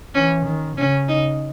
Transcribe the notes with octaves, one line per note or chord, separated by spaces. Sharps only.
E3 C#4
D#3
C#3 C#4
D#4